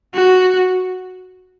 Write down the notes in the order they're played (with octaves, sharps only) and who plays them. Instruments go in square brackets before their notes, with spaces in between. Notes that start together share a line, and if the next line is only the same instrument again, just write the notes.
[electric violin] F#4